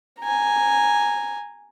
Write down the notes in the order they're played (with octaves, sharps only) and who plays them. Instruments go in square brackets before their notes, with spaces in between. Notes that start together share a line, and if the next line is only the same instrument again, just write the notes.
[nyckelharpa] G#5 A#5